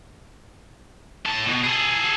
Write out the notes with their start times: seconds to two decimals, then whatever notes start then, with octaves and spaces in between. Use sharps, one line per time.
1.25 A2 A5
1.46 B2
1.63 G#4 A4